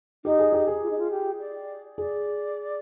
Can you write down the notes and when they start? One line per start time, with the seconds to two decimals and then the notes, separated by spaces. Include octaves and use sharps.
0.24 D#4 G4
0.39 G#4
0.53 G4
0.67 G#4
0.83 F4
0.90 D#4
0.98 F4
1.11 G4
1.40 D5
1.98 G#4 D5